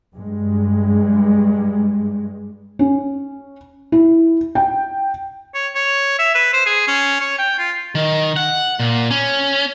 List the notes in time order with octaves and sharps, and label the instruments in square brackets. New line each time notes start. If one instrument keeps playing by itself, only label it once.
[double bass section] G2 G#3
[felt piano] C#4
E4
G5
[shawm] C#5
C#5
E5
B4
C5
G#4
C#4
C#5
G5
F4
[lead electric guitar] D#3
F#5
A#2
C#4